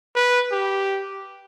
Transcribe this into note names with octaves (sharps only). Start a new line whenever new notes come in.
B4
G4